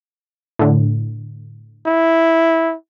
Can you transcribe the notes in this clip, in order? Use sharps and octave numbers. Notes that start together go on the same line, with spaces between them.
A2 D3
E4